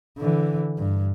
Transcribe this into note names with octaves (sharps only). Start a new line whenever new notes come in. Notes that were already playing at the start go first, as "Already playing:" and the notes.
D3 E3
G2